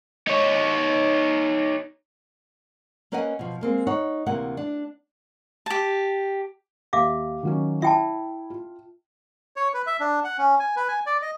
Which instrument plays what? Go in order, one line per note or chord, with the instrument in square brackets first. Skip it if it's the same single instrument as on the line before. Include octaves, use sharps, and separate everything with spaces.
[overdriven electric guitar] D#4 C#5
[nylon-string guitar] A#3 C#4 B4 D#5 F#5 G#5
B2 F3
G#3 A#3 C4
D#4 C#5 F#5
D2 C3 E3 A#3 F#5
D4
[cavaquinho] G4 A5
[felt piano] D#2 [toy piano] E5 F5 D6
[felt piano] D#3 F#3 C#4
[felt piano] E4 [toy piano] E5 G5 A5
[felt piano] F4
[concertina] C#5
B4
E5
D4
F#5
C#4
G#5
B4
G#5
D5
D#5